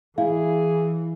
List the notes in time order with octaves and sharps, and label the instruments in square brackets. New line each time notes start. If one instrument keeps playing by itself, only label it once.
[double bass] E3 [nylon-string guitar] E4 [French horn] G#4 [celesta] F5